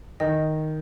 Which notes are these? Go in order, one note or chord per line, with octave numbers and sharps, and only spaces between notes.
D#3 D#5